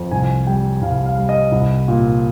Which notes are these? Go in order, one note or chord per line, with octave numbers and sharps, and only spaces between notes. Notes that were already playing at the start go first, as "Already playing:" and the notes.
Already playing: F2
C2 G#5
G3 G5
C2 F5
F5
G3
D#5
C2
A#2